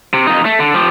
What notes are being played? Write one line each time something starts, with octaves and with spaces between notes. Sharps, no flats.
C3
F2 D#4
A3
D3
F3 G4